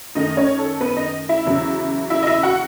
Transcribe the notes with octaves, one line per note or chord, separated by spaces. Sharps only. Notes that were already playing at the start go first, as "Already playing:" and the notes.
F#2 D#3 A3 D#4 D#5
C#4 C#5
A4
B3 B4
D#4 D#5
E4 E5
E2 C#3 F#3
E4 E5
D#5
E4 E5
F#4 F#5